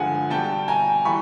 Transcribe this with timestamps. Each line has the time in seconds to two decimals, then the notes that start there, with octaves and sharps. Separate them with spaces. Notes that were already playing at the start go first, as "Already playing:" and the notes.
Already playing: G2 D3 F3 G#3 F#5 G#5
0.30 B2 G3 G5 A5
0.68 G#5 A#5
1.05 E3 G3 B5 C#6